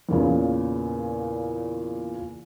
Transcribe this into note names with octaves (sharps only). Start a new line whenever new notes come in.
E2 A#2 C#3